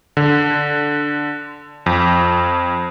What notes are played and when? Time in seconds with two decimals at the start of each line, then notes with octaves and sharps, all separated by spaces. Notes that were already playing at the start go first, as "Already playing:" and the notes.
0.17 D3
1.86 F2